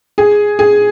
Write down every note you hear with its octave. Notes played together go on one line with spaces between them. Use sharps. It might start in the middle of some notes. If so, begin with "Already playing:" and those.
G#4
G#4